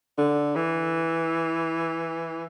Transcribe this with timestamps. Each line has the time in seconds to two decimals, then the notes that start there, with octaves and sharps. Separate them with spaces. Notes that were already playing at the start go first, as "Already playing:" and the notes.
0.18 D3
0.56 E3